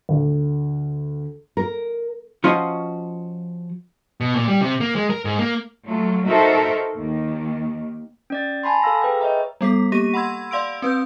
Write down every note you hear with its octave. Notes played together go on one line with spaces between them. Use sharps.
D2
A#4
F3 C#4 F4 F#4 D#5
B2
A#2
G3
C3
A#3
G#3
A#4
G#2
A#3
F#3 A3 F4
D#4 F#4 A4 A#4 C5 E5
D#2 D#3
C#4 D5 A6
G#5 A5 B5 C6
A4 F5 E6 A#6
G#4 B4 G5
C#5 D#5 E5 A#5
G3 B3 A4 B6
A#3 G4 A#6 D#7
F#5 B5 C6 E6 G#6
D5 F5 C6 E6 D7
C4 B4 E6 G6